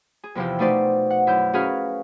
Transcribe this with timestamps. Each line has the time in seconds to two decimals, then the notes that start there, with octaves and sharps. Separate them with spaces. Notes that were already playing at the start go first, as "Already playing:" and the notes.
0.24 G#4
0.35 E2 C3 E3 F3 G4
0.59 B2 A3 D#4 C5 D5
1.10 F#5
1.27 F#2 E4 G6
1.53 C#4 F#4 G#4 A#4 B4 F5